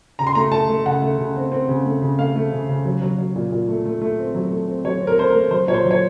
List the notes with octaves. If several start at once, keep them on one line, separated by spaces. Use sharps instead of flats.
C#3 A#5
C6
A3 A#5
A3 A5
A3
C#3 F#5
A3
C#3
C4
C4
C#3
A3
C#3
A3 F5
A3
C#3
C#3
F#3
F#3
F#3
A#2
A#2
A3
A3
A3
C4
F#3
A3
C4
F#3 C#5
C4
A#4
A3 C5
A#4
A3
F#3 C5
A#2 C#5
C5
F#3
C#5